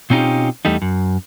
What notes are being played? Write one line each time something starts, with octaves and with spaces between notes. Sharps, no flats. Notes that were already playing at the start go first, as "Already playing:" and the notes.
B2 C4 C#4 D#4 F4 G4
E2 G3 A3 D#4
F#2